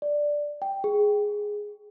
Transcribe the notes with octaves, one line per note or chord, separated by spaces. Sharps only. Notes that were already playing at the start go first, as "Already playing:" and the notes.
D5
G5
G#4